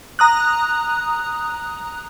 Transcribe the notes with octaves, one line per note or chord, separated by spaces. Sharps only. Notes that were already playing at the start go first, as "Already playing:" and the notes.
A#5 D#6 F#6